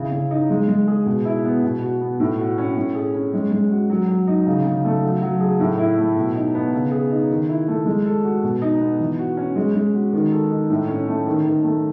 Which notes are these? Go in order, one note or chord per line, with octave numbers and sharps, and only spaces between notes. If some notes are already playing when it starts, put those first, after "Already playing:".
Already playing: C#3 E4
C#3
D#4
G#3
G#3
G#4
B2
E4
B3
B2
F#4
B3
A2
F#4
C#4
A2
G#4
C#4
G#3
G#3
F#4
F#3
F#3
D#4
C#3
C#3
A3
F#3
F#3
G#4
A2
E4
A3
B2
D#4
B3
C#3
G#4
D#4
D#3
E4
A3
G#3
A4
F#4
B2
D#4
B3
E3
F#4
C#4
G#3
G#3
F#4
D#3
A4
D#4
A2
C#4
A3
D#3
D#3
A3